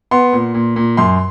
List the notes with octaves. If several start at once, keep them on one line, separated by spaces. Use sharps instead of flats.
B3 C6
A#2
A#2
A#2
F#2 C6